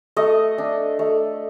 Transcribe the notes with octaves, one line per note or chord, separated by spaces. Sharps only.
A3 D#5
D4
A3